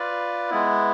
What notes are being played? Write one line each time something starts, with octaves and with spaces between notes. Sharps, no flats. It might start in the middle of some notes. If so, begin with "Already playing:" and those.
Already playing: F4 B4 D5
G#3 B3 E4